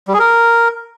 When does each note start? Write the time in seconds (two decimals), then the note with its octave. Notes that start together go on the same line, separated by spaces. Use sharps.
0.08 G3
0.13 G#4
0.19 A#4